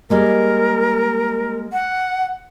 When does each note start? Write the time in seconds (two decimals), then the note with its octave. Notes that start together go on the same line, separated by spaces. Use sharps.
0.10 G3 G#3 A#3 A#4
1.73 F#5